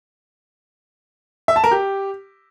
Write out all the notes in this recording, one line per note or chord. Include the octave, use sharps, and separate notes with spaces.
E5
A5
A#4
G4